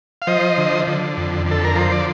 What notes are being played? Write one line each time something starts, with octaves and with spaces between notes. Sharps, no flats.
F5
F3 C5 D#5
D3
D3
F2
D3 A4
A#4
F3 C5
D5